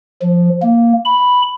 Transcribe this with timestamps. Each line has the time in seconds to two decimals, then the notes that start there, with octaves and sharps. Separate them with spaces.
0.22 F3
0.62 A#3
1.05 B5